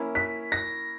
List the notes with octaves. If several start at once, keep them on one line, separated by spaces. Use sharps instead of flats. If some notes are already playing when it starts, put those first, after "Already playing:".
Already playing: A#3 C#4 E4
B6
A#6